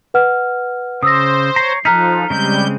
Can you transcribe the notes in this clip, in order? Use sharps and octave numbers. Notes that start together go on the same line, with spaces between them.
B4 F#5 F6
C#3 C5 D#6 E6 A#6
C#5 A#5 C7
F3 D#4 A4 A#5 F6 F#6 B6
C#3 G3 G#3 C4 G6